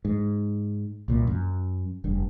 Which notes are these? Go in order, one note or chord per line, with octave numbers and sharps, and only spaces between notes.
G#2
C2 A#2
F#2
F1 G2